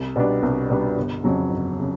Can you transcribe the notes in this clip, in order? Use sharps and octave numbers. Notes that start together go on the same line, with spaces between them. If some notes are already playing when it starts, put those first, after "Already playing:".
Already playing: C2
B2 G3 B3 D4
C2
B2 G3 B3 D4
G1
F2 C#3 F#3
G1
C#3